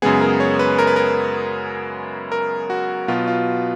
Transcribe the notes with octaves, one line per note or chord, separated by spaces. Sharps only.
F#2 C#3 G#3 B3 G#4
A#4
C#5
B4
A#4
B4
A#4
A#4
F#4
B2 F#3 B3 F4
F4